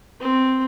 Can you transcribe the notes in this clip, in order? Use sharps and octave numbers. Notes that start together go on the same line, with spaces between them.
C4